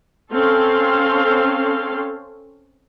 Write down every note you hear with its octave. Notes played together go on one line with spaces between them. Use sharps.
C4 C#4 A4 F5 C6